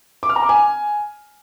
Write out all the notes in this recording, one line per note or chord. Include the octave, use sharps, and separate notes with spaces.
D6
F6
A#5
D6
G#5